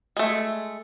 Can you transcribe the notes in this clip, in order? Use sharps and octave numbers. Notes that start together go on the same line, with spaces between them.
G#3 A3